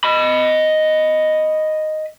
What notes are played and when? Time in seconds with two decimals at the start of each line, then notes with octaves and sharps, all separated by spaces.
0.04 D#5 B5